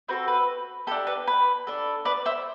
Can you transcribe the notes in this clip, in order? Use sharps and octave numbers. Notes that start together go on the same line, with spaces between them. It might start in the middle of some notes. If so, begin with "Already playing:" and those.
C4 F#4 A4 B4
B4
D4 G4 A4
B4
B4
D4 A4
B4 D5
C5 E5